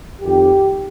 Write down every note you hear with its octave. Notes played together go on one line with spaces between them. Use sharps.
F2 D#3 G4